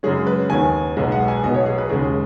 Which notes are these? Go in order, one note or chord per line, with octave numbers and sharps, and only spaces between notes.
F#2 C#3 G#3 C#4 G#4
B4
D#2 D#3 B3 G#5
B1 B2 G#3 B3 D#5
F#5
G#5
B1 B2 B3 D#5
C#5
G#4
B4
D#2 C#3 G#3 G#4